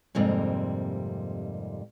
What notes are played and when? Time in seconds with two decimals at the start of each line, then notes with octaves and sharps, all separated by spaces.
0.15 F2 G#2 C3 G3 A#3